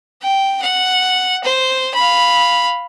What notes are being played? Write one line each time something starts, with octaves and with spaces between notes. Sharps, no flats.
G5
F#5
C5
F5 B5